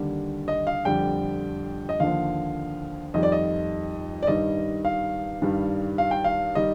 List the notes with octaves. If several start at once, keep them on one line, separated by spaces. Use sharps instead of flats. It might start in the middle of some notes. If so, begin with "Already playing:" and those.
Already playing: D#2 D3 G3
D#5
F5
F2 D3 G3 G5
D#5
D#2 D3 F3 F5
F2 D#3 G3 D#5
D5
D#5
D5
G2 D#3 G3 D#5
F5
G2 D#3 G3
F5
G5
F5
D#3 G3 D#5